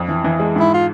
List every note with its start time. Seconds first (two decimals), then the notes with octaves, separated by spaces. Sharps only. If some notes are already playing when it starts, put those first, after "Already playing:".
Already playing: F2
0.09 E3
0.24 E3
0.40 G#3
0.56 G#2 E4
0.74 F4